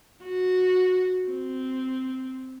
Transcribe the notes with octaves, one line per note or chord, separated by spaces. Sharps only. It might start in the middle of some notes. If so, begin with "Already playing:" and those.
F#4
C4